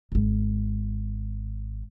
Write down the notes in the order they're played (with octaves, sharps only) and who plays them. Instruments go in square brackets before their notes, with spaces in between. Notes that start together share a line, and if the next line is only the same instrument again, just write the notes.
[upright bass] D#1 G#1